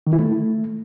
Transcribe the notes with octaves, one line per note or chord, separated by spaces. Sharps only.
D#3
E4
A3